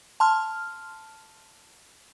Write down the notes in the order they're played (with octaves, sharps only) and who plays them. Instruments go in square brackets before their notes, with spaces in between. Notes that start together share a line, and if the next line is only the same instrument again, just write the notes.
[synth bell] A5 C6 F6